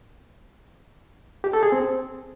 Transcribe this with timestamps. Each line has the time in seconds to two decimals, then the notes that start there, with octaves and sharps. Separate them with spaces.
1.44 G4
1.53 A4
1.63 G#4
1.72 C4